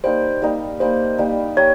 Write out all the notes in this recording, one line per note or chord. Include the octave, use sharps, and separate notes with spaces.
G3 A#3 D#4 C5
G3 A#3 D#4
G3 A#3 D#4 C5
G3 A#3 D#4
G4 A#4 C#5